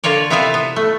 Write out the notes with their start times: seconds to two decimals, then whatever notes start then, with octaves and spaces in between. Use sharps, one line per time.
0.04 D3 A#3 F4 C#5 D5
0.30 C3 B3 E4 F4 E5 F5
0.54 B3
0.76 A3